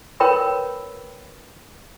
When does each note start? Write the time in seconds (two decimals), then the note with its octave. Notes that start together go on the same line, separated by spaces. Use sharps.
0.20 A#4 B4 C#5 G5 B5 E6